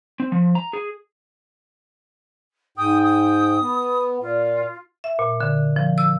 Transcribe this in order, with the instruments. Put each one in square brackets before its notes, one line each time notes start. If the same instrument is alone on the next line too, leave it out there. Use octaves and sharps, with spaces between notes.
[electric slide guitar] C4
F3
A#5
G#4
[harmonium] G#2 G5 [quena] D#6
[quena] D#6
[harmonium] B3
[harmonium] A#2 [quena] F4
[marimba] E5
A#2
D3
F3
E6